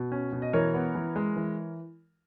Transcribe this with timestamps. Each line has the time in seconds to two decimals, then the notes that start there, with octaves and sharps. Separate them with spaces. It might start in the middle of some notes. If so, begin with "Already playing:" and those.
Already playing: B2
0.12 C#4
0.32 B2
0.42 D#5
0.53 E3 A#4 C#5
0.74 B3
0.95 E3
1.16 G#3
1.36 E3